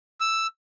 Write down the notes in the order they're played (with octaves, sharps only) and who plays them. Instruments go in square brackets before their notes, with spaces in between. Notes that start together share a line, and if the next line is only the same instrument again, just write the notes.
[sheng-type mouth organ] E6